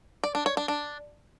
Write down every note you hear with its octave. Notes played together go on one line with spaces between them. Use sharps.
D5
D4
C#5
D4
D4